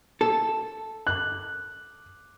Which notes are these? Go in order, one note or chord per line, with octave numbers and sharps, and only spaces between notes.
A4
F#6